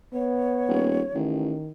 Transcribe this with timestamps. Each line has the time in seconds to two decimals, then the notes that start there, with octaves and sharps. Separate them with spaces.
0.14 B3 C#5
0.68 D#1
1.15 A1 D#3